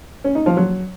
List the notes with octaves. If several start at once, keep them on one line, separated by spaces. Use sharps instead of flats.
C#4
D#4
F3
F#3